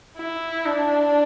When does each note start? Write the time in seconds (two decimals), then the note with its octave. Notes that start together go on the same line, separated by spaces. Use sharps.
0.19 E4
0.65 D4